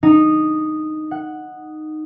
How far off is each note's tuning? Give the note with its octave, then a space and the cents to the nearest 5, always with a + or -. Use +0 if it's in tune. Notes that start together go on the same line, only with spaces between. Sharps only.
D#4 -10
F#5 +0